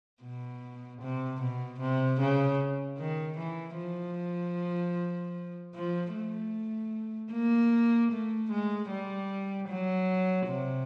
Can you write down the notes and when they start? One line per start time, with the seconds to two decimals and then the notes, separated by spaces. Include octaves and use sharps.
0.23 B2
1.01 C3
1.41 B2
1.80 C3
2.20 C#3
2.98 D#3
3.38 E3
3.77 F3
5.75 F3
6.13 A3
7.32 A#3
8.12 A3
8.51 G#3
8.90 G3
9.69 F#3
10.47 C3